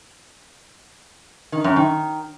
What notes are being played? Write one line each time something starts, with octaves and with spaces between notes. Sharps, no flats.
D#3
F#2
D#3